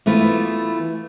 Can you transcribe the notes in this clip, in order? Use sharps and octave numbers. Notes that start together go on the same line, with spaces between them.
E3 A3 B3 F4 B4